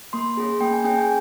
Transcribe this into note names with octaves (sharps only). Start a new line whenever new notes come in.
A#3 C6
C#4 G#4
A#3 G5
G#5
C#4 G#4 G5
G#5